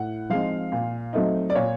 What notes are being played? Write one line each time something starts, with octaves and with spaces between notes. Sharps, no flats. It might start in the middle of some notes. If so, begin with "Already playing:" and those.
Already playing: A2 F#5
F3 G#3 C4 D#4 F5
A#2
F#3 A3 C4 D#4
D5
A#2 C#5